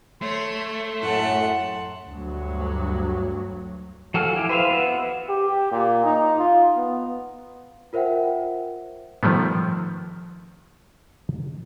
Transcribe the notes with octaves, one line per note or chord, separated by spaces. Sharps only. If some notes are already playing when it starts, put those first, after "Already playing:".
A3 C#5 C6
F#2 A2 F#5 A5
D2 G2 F#3
F3 F#4 A4 G#5 F6
E4 G4
B4 C5 E5 F5
B3 F#4 B4 E5
G4
A#2
D#4
F4
B3
F4 A#4 C5 E5 F#5 G5
D#3 F3 G3 A3 B3